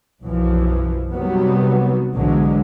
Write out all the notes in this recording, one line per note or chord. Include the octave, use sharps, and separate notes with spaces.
B1 F#2 E3 F3
C3 D#3 F#3 G3 B3
B1 G#2 D3 E3 F#3 G#3